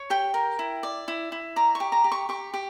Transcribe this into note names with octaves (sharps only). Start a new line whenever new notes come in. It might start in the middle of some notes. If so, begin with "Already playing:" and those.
Already playing: C#5
G4 G5
A#4
E4
D5
E4
E4
D5 A#5
C#6
G4
A#5
G4
C#6
G4 C#6
G4